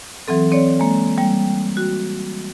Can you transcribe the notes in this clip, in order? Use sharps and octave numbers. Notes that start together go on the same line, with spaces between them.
E3 F#3 C4 A4
C4 C#5 D5
G#3 A#3
G3 A#3 G5
F#4